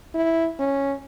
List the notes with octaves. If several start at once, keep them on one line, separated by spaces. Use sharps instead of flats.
E4
C#4